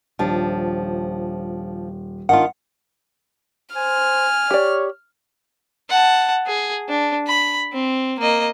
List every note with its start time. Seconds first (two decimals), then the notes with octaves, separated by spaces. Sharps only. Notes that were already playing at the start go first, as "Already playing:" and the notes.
0.19 D#1 F3 D4
2.29 D#3 D4 F4 F#5
3.76 C5 G#5 F6
4.51 G4 C#5 D5
5.89 F#5 A5
6.47 G#4
6.89 D4
7.27 B5
7.73 C4
8.19 A#3 D#5